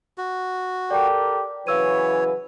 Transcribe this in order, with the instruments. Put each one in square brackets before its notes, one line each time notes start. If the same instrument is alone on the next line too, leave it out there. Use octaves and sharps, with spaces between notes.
[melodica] F#4
[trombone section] G4 A4 A#4 [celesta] D5 G5
[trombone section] C#3 E3 F#3 [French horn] B4 [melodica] C#5 [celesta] F5 E6 D#7